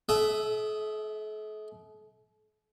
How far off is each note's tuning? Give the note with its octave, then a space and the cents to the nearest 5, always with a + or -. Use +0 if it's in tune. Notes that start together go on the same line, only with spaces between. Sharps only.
A3 -45 E5 +5 D#6 +0